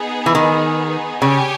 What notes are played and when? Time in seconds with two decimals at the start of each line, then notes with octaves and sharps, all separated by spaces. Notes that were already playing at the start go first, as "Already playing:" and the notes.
Already playing: B3 D#4 G#4
0.26 E3
0.35 D#3
1.21 C#3 G4 C#5 G#5